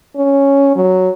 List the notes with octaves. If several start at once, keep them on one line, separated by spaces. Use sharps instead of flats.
C#4
F#3